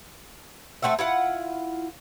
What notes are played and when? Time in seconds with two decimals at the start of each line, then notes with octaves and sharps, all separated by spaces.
0.82 A3 C4 F#4 E5
0.99 E4 F4 F#5